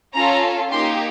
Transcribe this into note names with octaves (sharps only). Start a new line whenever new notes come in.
C#4 F4 A4 A#5
A#3 D#4 G4 C6